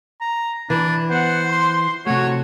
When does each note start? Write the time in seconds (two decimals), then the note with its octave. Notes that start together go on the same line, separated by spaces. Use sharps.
0.21 A#5
0.70 E3 D4
1.10 B3 C5 F#5
1.49 C6
2.07 C3 A3 F#4 C#5